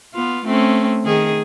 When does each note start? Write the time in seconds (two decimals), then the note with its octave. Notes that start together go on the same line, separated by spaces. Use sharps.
0.14 B3 F4
0.45 A3 C4 C#4
1.05 D#3 G#4